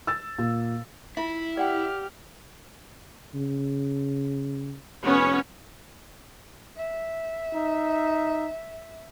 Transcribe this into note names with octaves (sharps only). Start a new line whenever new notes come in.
E6 A6
A#2
E4 F4 E5
G4 D5 F#5 G5 F6
C#3
F1 B3 C#4 C#5
E5
D#4